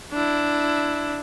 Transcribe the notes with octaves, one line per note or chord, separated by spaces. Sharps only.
D4 E4